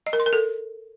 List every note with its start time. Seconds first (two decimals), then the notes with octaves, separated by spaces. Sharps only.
0.07 D#5
0.13 A#4
0.20 C6
0.26 A#4
0.33 A4